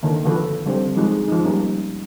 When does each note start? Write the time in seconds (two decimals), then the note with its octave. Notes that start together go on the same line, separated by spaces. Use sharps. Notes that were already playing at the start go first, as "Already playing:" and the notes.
0.03 D3 D#3 A#3
0.25 D3 F3 F#4 A4 B4
0.66 D3 G3 C4 D4 C5
0.96 F3 G#3 D#4 F#4 G#4
1.28 F3 D#4
1.44 G3 A#3 C#4